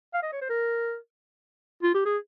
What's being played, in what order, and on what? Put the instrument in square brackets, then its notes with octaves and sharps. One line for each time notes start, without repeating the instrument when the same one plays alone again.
[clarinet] F5
D#5
C#5
C5
A#4
F4
G4
G#4